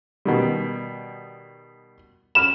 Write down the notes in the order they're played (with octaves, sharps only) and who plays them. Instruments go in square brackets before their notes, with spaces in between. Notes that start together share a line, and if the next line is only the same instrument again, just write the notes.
[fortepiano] B2 D#3 G3
[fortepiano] B5 F6 [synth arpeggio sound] E7